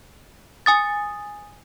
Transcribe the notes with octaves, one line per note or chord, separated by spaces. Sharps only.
G#5 D#6 A6